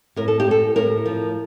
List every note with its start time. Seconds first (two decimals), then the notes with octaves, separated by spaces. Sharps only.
0.16 A2 A#4
0.28 A4
0.40 G4
0.47 A2 A4
0.76 A2 A#4
1.06 F3